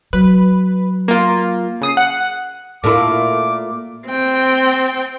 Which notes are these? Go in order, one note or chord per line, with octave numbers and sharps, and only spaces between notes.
F#3 B4
A#3 F4
C#3 D#6 C7
F#5
A#2 A3 E4 D6
C4 G5